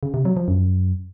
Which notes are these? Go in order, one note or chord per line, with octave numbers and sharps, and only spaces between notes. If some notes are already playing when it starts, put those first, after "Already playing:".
C#3
C3
F#3
F3
F#2